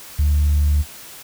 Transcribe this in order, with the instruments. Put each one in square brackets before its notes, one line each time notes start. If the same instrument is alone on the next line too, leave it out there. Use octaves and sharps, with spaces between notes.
[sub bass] D2